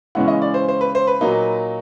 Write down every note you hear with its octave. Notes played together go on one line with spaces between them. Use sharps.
C#3 E3 G#3 C#4 E4 F#5
D#5
D5
C5
C5
B4
C5
B4
A#2 F#3 A#3 D#4